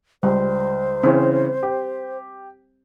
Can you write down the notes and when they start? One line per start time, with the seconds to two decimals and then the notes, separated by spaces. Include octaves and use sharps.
0.23 C#2 G3 C5
1.04 C#3 E3 C4 C#4
1.63 G4